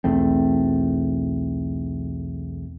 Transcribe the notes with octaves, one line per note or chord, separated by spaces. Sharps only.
B1 E2 A3 C4